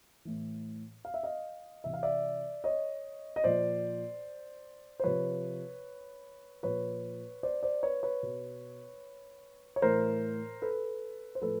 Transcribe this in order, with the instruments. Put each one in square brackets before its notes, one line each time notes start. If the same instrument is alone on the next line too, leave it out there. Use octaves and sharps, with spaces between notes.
[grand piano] A2 E3
F5
E5
D#5 F5
C3 E3 E5
F5
D5 E5
C#5 D#5
D#5
A#2 F3 C5 D5
C5
C3 F3 B4 C#5
A#2 F3 B4 C#5
C5 D5
C5 D5
B4 C#5
B4 C#5
B2
C#5
A2 E3 A#4 C5
A4 B4
C5
A2 F3 A4 B4